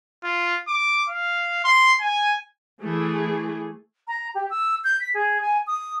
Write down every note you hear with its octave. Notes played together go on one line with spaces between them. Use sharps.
F4
D6
F5
C6
G#5
E3 A3 G#4
A#5
G4
E6
G6
B6
G#4
G#5
D#6